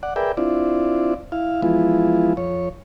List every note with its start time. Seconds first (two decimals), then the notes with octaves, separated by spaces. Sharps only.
0.03 D5 F#5
0.16 G#4 A#4 B4 D5 E5 G5
0.37 C4 D4 E4 F4 D5
1.32 E4 F5
1.62 E3 F3 G#3 B3 E4 F4
2.37 F2 C#5